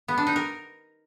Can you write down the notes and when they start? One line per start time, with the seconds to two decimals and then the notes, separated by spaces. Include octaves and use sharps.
0.08 B3
0.18 D4
0.27 D#4
0.36 A#4